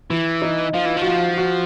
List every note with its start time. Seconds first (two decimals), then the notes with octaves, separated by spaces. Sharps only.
0.10 E3 E4
0.42 D#4
0.74 F3 F4
0.85 E3
0.97 F3 F#4
1.06 F4
1.38 F#4